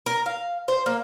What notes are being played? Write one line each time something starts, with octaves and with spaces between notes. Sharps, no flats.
A#4
F5
C5
A#3